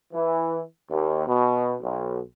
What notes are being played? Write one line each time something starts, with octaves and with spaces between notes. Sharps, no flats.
E3
D#2
B2
B1